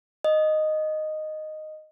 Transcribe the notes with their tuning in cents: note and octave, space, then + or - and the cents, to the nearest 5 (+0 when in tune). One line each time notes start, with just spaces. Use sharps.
D#5 -5